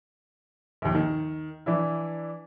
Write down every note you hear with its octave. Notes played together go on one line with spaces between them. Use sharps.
A#1 D#2
D#3
E3 D4 E4